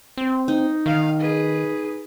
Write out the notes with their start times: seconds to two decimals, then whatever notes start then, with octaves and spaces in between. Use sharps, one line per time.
0.17 C4
0.48 D#4
0.86 D#3 F5
1.19 G#4 B4